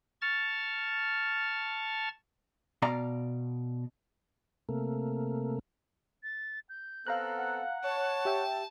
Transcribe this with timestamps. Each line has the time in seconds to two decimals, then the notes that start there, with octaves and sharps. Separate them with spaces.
0.22 A5 C#6 F6 A6
2.82 B2 D5 F5 A#5
4.69 C3 A3 A#3
6.23 A6
6.69 G6
7.07 B3 C4 A4 F5 A#5 F#6
7.37 F#5
7.84 C#5 A5
8.25 G4 E5 G5